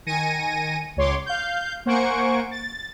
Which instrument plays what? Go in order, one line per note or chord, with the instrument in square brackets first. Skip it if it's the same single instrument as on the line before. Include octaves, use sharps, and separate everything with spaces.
[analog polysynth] D#3 G#5 A#6 C#7 D#7
C#2 C#5 C6 D6
F5 G6
A#3 C5 F#5 G#5 C#6 D7
A6